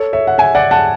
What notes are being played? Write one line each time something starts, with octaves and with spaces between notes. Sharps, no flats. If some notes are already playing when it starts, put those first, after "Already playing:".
Already playing: A4 C#5
C#5 E5
F#5
E5 G#5
D5 F#5
F#5 A5